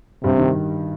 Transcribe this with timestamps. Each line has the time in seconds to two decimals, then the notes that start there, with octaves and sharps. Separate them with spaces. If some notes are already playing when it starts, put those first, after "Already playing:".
0.24 G2 C3 G3
0.38 D#3